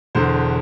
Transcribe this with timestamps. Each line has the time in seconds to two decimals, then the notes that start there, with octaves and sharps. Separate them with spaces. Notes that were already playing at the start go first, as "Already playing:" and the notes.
0.15 E1 E2 D3 C5